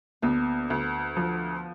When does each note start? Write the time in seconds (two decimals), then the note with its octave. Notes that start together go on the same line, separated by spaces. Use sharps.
0.22 D2 B3
0.70 D2
1.17 F3